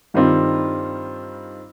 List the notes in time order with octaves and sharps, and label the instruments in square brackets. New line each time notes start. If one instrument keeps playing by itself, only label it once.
[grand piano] G2 D#3 G3 C4 F4